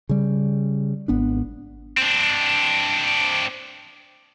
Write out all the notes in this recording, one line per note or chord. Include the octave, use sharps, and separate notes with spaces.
C#3 G3
G#1 B3 D4
C4 D4